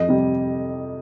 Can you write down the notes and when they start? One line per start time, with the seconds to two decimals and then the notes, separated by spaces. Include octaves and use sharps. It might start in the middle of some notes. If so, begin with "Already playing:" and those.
Already playing: F2 D#5
0.09 C3 G3